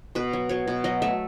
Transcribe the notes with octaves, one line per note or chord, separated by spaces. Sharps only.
B2 B4
F#3
F#3 C#5
B2
F#3 D#5
A3 E5